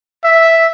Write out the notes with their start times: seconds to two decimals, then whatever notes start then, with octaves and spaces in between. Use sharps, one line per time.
0.24 E5